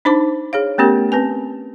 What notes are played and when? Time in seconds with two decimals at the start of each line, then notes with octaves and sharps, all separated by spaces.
0.05 D4 D#4 C5 A5 D6
0.53 G#4 C#5 F5
0.78 A3 B3 C#4 G4 A#4
1.12 C4 B4 G#5